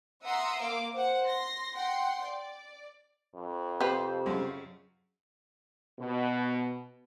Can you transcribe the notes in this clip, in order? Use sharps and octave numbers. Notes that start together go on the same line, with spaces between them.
E5 F#5 A#5 C6 D#6 E6
A#3 F5 D6
C5 F#5
C6 A#6
F#5 G5 C6
D5
F2
C3 G4 B4 C5
F#2 C#3
B2